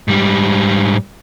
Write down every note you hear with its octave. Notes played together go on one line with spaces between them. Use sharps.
G#2 G3